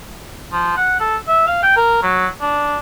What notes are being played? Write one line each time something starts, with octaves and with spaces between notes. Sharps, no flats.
F3
F#5
A4
E5
F5
G5
A#4
F#3
D4